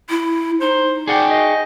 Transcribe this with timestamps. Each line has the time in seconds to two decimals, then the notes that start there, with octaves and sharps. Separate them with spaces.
0.09 E4
0.61 D#4 C5
1.07 G#4 D5 F#5 G5
1.30 D#5